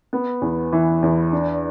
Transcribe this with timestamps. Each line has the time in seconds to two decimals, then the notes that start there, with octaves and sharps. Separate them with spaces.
0.13 B3
0.42 E2
0.73 E3
1.02 E2
1.33 D4